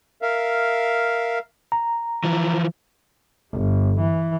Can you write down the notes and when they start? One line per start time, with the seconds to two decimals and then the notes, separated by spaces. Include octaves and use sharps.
0.22 A#4 E5 F5
1.72 A#5
2.24 E3 F3
3.52 G1
4.01 E3